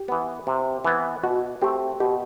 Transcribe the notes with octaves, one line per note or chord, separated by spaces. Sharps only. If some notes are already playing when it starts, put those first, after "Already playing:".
Already playing: G4
E3 B3
C3
E3 B3
B2 F#4
A3 C4 G4
B2 G4